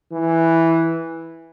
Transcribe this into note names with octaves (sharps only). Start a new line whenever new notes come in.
E3